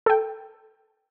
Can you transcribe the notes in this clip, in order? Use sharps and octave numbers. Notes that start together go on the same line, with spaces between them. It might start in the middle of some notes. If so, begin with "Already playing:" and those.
A4 G5